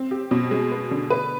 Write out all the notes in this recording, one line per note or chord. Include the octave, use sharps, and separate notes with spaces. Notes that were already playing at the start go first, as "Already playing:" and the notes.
Already playing: C4
G4
B2
G#3
B3
D3
B4